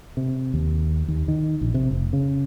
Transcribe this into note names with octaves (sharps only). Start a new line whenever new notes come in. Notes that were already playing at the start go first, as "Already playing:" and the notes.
C3
D#2
D#2
D#3
A#1
C3
F1
C#3